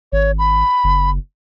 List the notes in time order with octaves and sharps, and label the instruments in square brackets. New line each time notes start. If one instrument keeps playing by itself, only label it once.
[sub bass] G#1 [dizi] C#5
[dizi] B5
[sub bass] F#1